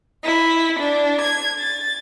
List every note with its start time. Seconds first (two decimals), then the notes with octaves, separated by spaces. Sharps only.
0.24 E4
0.79 D4
1.21 G#6
1.58 A6